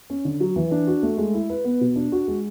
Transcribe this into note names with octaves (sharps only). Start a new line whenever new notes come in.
C#4
D3
F#3
E3
D4
F#4
A3
G#3
E4
B4
B3
B2
D4
F#4
G#3